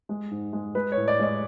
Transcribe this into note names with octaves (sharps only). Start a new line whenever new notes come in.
G#3
G#2
G#3
G#3 B4
C#5
A2
D5
G#3 D5